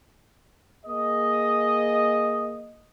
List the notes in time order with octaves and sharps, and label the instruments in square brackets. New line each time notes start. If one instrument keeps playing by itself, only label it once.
[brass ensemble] A#3 G#4 D#5